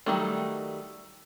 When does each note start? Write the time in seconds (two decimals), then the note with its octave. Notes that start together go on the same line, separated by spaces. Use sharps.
0.06 D#3 F#3 G3 A3